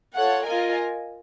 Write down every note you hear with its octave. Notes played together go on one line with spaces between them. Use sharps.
F4 A4 C#5 F#5
F4 A#4 D#5 G#5